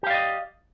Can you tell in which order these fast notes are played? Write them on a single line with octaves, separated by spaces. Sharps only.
G4 F5 D5 D#5